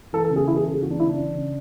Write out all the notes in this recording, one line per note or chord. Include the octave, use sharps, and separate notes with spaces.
E3 A4
A4
C#3
G#4
E3 E4
G#4
C#3 A4
G#4
E3 F#4
D4
C#3 E4
D4
E3
C#3